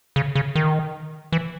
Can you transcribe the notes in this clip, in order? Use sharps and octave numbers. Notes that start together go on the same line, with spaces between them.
C#3
C#3
D#3
E3